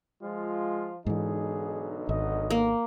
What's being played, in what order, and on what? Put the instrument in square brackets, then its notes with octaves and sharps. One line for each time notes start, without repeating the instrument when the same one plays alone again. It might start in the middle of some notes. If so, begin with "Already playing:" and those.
[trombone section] F3 F4 [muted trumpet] G#3
[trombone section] B1 D3 D#4 [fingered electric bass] G#2 E3 [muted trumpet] G#4
[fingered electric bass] G#1 [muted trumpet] D#5
[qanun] A#3